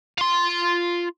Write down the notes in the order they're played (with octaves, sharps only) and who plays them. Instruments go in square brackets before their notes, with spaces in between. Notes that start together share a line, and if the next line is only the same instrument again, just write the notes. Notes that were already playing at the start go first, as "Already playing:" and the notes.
[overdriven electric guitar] F4 C6